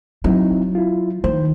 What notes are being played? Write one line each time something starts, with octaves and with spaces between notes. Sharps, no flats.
F#3 C4 D#4 E4
E4 F4
D#3 C5